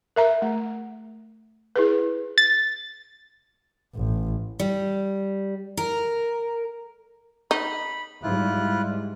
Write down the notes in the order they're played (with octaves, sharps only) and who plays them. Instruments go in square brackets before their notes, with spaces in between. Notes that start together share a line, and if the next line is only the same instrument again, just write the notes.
[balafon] A#4 E5 A#5
A3
E4 G#4 B4
[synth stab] A6
[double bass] A1
[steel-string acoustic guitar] G3
A#4
[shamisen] D#4 [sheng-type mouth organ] B5
[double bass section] G#2 G3 [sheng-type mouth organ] E4 F4 F#6